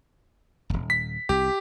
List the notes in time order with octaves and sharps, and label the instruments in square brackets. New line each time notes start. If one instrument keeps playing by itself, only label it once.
[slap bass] D#1 G#1
[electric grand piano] B6
[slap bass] C2 [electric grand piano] G4